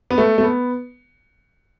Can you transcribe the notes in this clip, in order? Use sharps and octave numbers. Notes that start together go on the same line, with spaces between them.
B3
A3
A3
B3